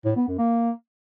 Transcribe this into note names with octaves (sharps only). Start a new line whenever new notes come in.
A2
B3
F#2
A#3